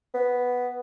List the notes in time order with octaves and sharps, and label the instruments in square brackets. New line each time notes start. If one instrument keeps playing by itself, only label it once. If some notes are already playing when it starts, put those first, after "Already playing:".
[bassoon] B3